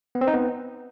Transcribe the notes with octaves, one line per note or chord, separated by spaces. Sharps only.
B3
C4
D#4
B3